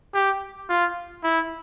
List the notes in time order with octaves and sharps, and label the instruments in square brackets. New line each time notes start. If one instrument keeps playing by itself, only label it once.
[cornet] G4
F4
E4